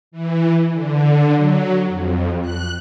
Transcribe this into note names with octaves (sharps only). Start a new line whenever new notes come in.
E3
D3
F#3
F2
F#6